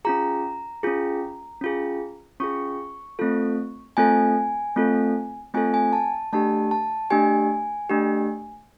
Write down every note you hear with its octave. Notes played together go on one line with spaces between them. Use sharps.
C#4 F4 G#4 A#5
C#4 F4 G#4
C#4 F4 G#4
C#4 F4 G#4 C#6
A3 C4 F4 A4
A3 C4 F4 A4 G#5
A3 C4 F4 A4
A3 C4 F4 A4 G#5
G#5
A5
A3 D4 G4 A5
A5
A3 D4 G4 G#5
A3 D4 G4